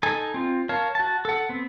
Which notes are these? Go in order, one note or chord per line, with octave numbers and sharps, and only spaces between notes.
D#4 A4 G#5
C4 F4
A#4 C#5 F5 A5
F#4 A5
A4 F#5
B3 C4